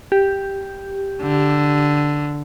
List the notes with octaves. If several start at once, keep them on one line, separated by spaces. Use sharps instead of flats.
G4
D3